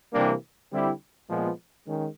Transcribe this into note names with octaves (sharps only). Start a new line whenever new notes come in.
C3 E3 G3 A#3 D4
D3 G3 C4 E4 G4
A#2 F3 G#3 B3
D#3 G#3 C#4